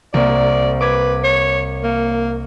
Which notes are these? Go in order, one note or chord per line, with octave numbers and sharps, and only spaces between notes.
C2 A#3 D5
B4 D6 G#6
C#5
A#3